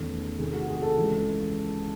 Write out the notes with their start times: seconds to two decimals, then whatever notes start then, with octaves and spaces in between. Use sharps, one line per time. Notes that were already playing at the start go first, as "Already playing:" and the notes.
Already playing: E2 D#3 A3 C#4
0.39 C3 D#3 A3 G#4
0.53 F#4
0.68 G#4
0.82 A4
0.97 C#2 C#3 E3